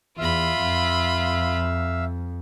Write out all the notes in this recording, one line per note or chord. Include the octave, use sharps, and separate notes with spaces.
E2 F4 E5 F5 B5 E6
F2